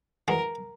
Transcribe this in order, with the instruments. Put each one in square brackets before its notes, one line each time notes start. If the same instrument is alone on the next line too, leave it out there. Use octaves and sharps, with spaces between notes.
[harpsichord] E3 G#3 C#4 F#4 [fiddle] A#4